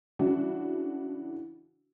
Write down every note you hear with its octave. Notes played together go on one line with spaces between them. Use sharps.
C#3 E3 D4 E4 F#4